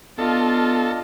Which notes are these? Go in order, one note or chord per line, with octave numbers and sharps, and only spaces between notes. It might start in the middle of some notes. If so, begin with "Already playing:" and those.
B3 D4 F4 A4 D#5 F5